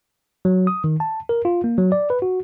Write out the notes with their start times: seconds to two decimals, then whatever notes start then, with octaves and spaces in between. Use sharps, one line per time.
0.45 F#3
0.67 D#6
0.84 D#3
1.00 A5
1.29 A#4
1.45 F4
1.64 A#3
1.78 F#3
1.92 D5
2.10 B4
2.22 F#4